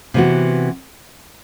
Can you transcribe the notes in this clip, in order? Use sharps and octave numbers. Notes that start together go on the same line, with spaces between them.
C3 E3 B3 F#4